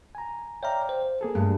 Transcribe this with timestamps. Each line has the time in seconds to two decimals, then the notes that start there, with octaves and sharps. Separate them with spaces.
0.15 G#5 A#5
0.63 C#5 D5 E5 F5 G5 A#5
0.89 C5
1.21 A#3 G#4 A4
1.35 G2 A3